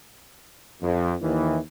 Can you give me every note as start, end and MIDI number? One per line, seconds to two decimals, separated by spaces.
0.82 1.14 41
1.22 1.58 39
1.22 1.58 51
1.22 1.58 52